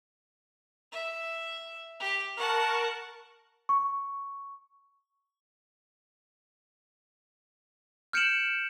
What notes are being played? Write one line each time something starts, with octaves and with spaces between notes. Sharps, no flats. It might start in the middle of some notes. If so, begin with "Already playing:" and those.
E5
G4
A#4 F#5 A5 C#6
C#6
F6 G6 C#7 D7 E7 F#7